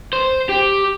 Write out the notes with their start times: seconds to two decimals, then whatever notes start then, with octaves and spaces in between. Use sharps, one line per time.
0.13 C5
0.49 G4